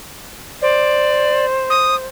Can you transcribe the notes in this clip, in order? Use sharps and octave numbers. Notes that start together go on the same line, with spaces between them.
C5 D5
D#6